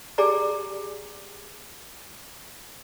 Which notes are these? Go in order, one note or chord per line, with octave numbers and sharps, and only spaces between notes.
G4 G#4 D5 G#5 A#5